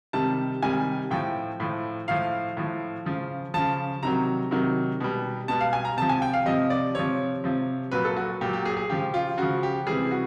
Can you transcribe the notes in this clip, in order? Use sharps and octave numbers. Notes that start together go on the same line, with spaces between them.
C3 D#3 G3 A5
C3 D#3 G3 G#5
A2 F3 G5
A2 F3
A2 F3 F5
A2 F3
C#3 F3
C#3 F3 A5
C3 D#3 F#3 A#5
C3 D#3 F#3
B2 G3
B2 G3 A5
F5
G#5
A#5
C3 F3 A5
G#5
G5
F5
C3 F3 D#5
D5
C3 F3 C#5
C3 F3
A#2 F#3 B4
A4
F#4
A#2 F#3 G4
G4
G#4
G4
G#4
C#3 F3 G4
F4
C#3 F3 F#4
G4
C3 E3 G3 G#4
F#4